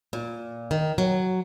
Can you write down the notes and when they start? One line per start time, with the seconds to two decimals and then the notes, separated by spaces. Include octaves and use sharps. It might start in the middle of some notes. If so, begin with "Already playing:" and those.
0.13 A#2
0.71 D#3
0.98 F#3